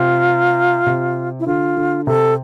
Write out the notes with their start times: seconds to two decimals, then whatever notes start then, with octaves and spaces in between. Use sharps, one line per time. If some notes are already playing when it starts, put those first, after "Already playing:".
Already playing: C3 F4
0.87 C3
1.40 E4
1.47 D3 F4
1.77 D3
2.07 C3 A4